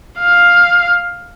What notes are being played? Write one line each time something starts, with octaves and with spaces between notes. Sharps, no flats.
F5